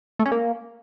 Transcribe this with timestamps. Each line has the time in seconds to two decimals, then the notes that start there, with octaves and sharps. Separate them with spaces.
0.19 A3
0.25 C#4
0.31 A#3